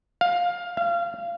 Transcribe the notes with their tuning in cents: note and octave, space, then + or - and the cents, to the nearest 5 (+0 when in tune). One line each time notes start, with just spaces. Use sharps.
F5 +15
F5 -25